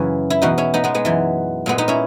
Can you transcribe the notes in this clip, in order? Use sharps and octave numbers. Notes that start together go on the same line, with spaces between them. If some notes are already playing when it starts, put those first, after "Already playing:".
Already playing: F#2 C#3 E3 C#4 E4
E4
E2 B2 D#4 F#4
C#4 E4
B3 D#4
G#3 B3
G#3 B3
F#2 E3
A#2 G#3 B3
B3 D#4
C#4 E4